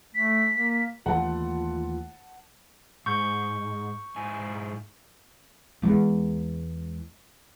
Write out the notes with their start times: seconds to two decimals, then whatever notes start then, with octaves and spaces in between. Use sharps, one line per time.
0.15 A3 B6
0.52 A#3
1.06 D#2 E3 A3 F4 F#5 A5
3.06 G#2 C#6 G6
4.16 G#2 E4 G#5
5.82 E2 G#3